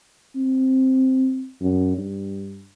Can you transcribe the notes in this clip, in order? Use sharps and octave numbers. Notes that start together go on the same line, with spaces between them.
C4
F#2
G2